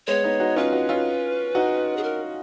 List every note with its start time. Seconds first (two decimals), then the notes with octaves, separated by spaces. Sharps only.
0.07 G#3 B3 C#5
0.24 B3 D#4
0.40 D#4 F#4
0.56 C#4 F4 B4
0.73 D#4 F#4
0.89 C#4 F4
1.55 D#4 F#4
1.97 G#4
2.03 A#4